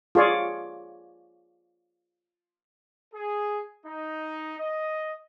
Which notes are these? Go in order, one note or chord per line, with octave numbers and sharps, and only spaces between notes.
F4 G#4 C#5 D5
G#4
D#4
D#5